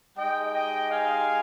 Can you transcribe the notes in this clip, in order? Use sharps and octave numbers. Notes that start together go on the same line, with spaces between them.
G#3 D#4 G4 D#5 G5
D#5 G5
F5 G#5